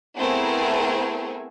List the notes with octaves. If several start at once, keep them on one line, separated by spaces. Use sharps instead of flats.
A3 B3 C4 E4 G#4 A#4